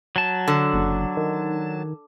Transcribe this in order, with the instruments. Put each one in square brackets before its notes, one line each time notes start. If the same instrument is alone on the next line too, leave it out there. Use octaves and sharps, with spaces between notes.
[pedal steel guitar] F#3 A5
[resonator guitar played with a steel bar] D3
[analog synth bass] F#1
D#3